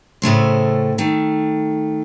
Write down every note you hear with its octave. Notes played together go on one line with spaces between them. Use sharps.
A2 C#3 A3 C5
D#3 A3